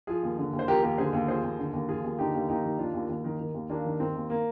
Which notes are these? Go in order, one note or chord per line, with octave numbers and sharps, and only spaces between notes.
F3 F4 G#4
D#2
D3
D#2
C5
F3 G4 A#4
D#2 G4 A#4
D3 G#4 C5
D#2
F3 G#4 C5
D#2
D3
D#2
F3 F4 G#4
D#2
D3 D#4 G4
D#2
D#2 D#4 G4
D#3
D#3 D4 F4
D#2
D#2
D#3
D#3
D#2
D#2 A#3 D4
D#3
D#3 C4
D#2
A#3